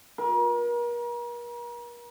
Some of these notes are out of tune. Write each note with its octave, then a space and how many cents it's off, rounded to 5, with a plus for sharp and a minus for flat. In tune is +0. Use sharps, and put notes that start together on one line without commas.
A#4 +40